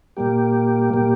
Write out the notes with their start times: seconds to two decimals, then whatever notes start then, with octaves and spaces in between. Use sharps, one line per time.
0.17 A#2 G3 A#3 G4
0.93 A#2 G3 A#3 G4